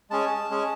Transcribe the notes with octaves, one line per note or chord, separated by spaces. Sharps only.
G#3 C#4 G#4 A5
G#3 C#4 G#4